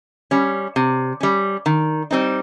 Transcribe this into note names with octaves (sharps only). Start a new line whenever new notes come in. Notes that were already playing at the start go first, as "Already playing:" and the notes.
G3 C#4
C3
G3 C#4
D#3
G3 C4 D#4